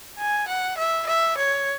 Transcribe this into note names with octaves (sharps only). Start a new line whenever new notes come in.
G#5
F#5
E5
E5
C#5